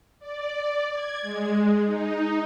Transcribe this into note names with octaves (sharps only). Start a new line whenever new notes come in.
D5
G#6
G#3
D#4